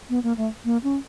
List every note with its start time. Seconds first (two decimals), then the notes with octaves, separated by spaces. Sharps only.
0.10 B3
0.23 A#3
0.37 A3
0.65 A#3
0.84 C#4